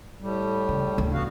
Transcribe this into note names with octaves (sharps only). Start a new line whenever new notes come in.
A2 G3
C#3
A1 D2
B3 F#4 F5